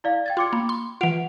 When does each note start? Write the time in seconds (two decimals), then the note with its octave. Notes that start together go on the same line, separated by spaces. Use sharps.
0.04 E4 D5 F5
0.26 G5 G#6 A6
0.37 F4 C6 D6 C#7
0.53 A#3 B5
0.69 C6
1.01 E3 F4 F#5 D7 F7